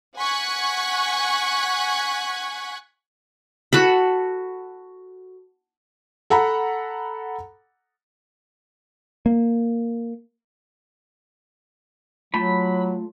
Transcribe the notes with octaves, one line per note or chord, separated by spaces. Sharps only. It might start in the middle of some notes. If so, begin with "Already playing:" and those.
F#5 G#5 C#6 F#6 G#6 B6
F#4 A4 B5
A4 F#5 A#5 B5
A#3
F#3 A3 F4 A5 B5